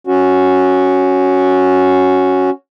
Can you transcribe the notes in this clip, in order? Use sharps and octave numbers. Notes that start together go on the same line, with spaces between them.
C#4 F#4